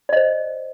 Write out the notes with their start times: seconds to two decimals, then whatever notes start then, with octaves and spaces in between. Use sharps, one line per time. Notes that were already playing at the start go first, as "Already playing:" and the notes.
0.09 D5
0.13 D#5
0.16 C5